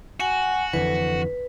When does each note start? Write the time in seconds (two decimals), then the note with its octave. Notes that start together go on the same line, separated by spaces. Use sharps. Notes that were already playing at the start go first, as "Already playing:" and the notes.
0.20 F#4 F#5 G#5
0.73 F2 D3 E3 B4